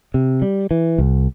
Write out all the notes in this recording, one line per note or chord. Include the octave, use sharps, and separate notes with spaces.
C3
G3
E3
C2